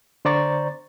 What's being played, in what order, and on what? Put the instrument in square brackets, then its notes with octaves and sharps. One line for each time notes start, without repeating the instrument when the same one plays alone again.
[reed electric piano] D3 C5 D5 A#5 C#6 A6